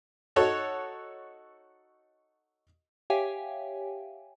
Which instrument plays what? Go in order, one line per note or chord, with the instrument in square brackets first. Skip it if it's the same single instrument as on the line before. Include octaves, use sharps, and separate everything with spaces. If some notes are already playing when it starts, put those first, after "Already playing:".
[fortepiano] D#4 F#4 A4 C#5
[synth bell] G4 C#5 E5 F5 G5 G#5